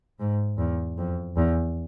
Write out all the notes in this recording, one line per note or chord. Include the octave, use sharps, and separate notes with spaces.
G#2
E2
F2
E2